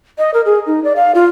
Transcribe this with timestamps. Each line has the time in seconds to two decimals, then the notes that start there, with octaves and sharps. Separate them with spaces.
0.18 D#5
0.34 A#4
0.46 G#4
0.66 D#4
0.84 D5
0.96 F5
1.15 F4